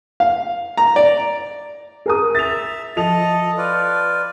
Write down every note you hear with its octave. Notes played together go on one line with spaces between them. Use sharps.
F5
A#5
D5
G#4 A#4 D#6
E5 A6 F7
F3 A4 D#5 F7
F4 B4 D5